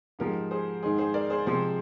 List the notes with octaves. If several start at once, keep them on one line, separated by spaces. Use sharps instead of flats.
G#2 F3 G#3 G4 A#4
G#4 C5
G#2 D#3 G#3 G#4 C5
G#4 C5
A#4 D5
G#4 C5
C3 F3 G#3 G#4 C5